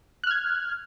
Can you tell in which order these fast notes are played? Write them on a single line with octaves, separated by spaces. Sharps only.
F#6 F6 G#6